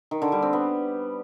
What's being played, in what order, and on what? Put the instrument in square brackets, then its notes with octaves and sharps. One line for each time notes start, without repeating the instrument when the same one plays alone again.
[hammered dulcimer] D#3
D3
G3
C4
B3